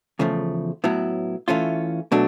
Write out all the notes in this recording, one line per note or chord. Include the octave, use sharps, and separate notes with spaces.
E2 C#3 F3 A3
A2 F#3 B3 E4
E3 A3 C#4 F4
B2 F#3 A3 D4